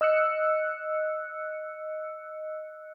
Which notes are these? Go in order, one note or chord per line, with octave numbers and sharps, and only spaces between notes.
D#5 E6 F#6 C#7